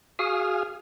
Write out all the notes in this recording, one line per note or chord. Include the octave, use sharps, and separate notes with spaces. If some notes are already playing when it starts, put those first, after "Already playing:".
F#4 G#4 F5 G#5 D#6 F6